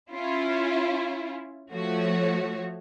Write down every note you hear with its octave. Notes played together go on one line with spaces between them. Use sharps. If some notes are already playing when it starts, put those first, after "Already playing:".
C#4 E4 F4
F3 A3 F#4 C#5